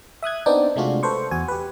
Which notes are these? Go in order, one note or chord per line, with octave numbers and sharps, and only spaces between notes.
E5 D#6 F#6 G#6
B3 C4 D4 D#4 D5 G5
C3 G#3 A3 D4 F4 F#4
A4 B4 C5 C#6
E2 F#4 G#5
G4 B4